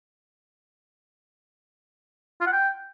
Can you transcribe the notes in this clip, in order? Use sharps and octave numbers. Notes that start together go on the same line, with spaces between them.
F4
F#5
G5